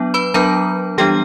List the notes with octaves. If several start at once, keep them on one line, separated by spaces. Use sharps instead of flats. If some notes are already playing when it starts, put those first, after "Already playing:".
Already playing: F#3 B3 D4
B4 B5
F#3 B3 D4 A#4 A#5
E3 G3 B3 D4 G4 G5